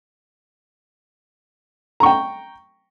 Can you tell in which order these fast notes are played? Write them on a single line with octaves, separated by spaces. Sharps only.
A#5 C#6 G5